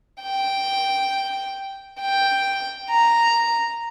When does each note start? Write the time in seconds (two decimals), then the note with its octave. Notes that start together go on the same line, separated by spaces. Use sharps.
0.21 G5
2.01 G5
2.90 A#5